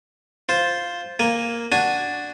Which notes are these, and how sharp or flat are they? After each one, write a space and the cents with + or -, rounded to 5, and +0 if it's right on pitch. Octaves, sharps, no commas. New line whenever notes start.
F4 +0 C5 +0
A#3 +0 G#5 -10
D4 +0 F#4 +0 G#5 +0